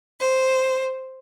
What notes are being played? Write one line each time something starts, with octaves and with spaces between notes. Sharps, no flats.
C5